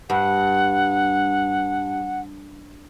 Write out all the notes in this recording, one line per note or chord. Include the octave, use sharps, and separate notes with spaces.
G2 F#5